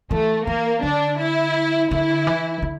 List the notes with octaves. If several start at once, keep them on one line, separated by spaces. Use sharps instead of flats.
E3 A3
E3 A#3
D3 D4
E4
D3 E4
E3
D3